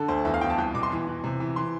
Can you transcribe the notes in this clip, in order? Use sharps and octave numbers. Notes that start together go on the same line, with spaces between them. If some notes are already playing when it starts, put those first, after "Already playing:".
Already playing: D3 A4
D2 C5
E2 E5
F5
E2 G5
A5
C2 G5
B2 D6
C6
E3
E3
C3
E3
E3 C6